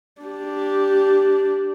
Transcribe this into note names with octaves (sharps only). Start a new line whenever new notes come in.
D4 G4